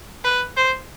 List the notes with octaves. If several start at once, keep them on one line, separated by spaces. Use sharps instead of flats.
B4
C5